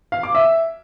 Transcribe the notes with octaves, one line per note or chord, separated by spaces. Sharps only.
F5
D6
E5